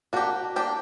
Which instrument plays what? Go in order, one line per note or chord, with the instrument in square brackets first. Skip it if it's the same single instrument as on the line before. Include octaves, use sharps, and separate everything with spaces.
[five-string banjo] A#3 D4 G4 [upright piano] F#4
[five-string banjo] A#3 D4 G4